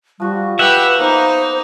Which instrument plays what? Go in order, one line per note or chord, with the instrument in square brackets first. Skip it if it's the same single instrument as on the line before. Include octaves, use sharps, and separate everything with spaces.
[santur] F3 F#4 C#6 [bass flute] G3
[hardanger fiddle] G4 [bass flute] B4 [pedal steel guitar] E5 F#5
[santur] A#3 B3 A#5 [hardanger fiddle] D#4 [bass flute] C5